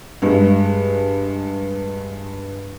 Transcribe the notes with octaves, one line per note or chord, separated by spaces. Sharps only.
G2 G#3